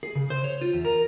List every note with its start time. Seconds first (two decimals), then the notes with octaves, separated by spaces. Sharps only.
0.03 G#4
0.15 C#3
0.30 C5
0.44 C#5
0.61 F4
0.73 E2
0.85 A#4